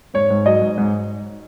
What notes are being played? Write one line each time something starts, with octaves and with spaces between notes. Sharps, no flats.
G#2 C#5
G#2
F#3 D#5
G#2
G#2